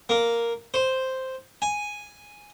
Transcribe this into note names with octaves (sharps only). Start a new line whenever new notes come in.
A#3
C5
G#5